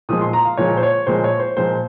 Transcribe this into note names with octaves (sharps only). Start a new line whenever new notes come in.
A#2 F3 G#3 D#6
C6
A#5
F5
A#2 F3 G#3 C#5
C5
C#5
A#2 F3 G#3 C5
C#5
C5
A#2 F3 G#3 C5